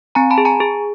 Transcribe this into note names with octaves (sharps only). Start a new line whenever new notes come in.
C4 G#5 A#5
A5 B5
G#4
G#5 A#5
G#4